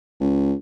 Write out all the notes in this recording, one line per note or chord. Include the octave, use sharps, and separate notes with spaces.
C#2